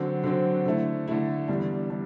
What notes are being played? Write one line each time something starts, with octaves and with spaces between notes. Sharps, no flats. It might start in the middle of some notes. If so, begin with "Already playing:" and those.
Already playing: D3 F#3 C4 F#4
D3 F#3 C4 F#4
D3 A3 E4
D3 A3 E4
E2 D3 G3 D4
G3 D4